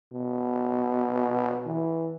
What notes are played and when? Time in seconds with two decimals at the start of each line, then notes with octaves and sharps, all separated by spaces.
0.13 B2
1.66 E3